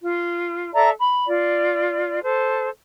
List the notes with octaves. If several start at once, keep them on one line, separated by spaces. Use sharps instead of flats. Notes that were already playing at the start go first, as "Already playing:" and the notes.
F4
A4 D5 E5 A#5
B5
F4 D5
A4 C5